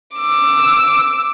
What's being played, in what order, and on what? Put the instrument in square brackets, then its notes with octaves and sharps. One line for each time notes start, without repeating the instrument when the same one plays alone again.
[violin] D6 E6